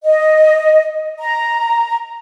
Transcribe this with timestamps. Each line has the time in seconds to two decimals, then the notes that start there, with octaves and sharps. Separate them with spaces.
0.04 D#5
1.19 A#5